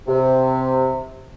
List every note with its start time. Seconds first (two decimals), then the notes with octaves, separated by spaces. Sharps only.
0.08 C3